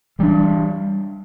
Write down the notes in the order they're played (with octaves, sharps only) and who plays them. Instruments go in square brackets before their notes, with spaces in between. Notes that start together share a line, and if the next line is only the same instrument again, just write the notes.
[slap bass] E3 G3 D4